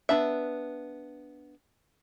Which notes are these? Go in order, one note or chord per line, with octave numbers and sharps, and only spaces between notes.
B3 D4 E5